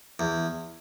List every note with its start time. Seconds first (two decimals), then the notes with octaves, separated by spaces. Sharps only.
0.19 E2